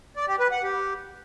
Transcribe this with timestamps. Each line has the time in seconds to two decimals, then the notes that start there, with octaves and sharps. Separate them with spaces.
0.16 D5
0.28 G4
0.40 B4
0.51 F#5
0.63 G4